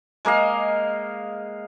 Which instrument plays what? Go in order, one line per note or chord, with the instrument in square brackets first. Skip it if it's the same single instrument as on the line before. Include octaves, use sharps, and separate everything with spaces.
[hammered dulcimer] G#3 A#3 D#5 F5